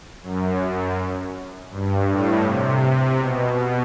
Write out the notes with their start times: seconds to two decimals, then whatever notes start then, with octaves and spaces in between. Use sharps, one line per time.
0.23 F#2
1.71 G2
2.08 A2
2.45 C3
3.18 B2